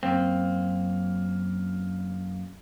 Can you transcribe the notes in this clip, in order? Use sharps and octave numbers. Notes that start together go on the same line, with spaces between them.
F#2 A#3 C4